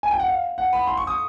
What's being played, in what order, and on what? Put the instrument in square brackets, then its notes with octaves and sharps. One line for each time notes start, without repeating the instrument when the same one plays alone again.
[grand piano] G#5
G5
F#5
F5
F#5
B5
C6
C#6
D#6